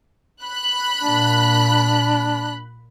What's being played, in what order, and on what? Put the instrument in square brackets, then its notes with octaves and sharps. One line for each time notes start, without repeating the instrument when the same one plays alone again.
[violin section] B5 F#6
[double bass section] A#2 [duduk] D4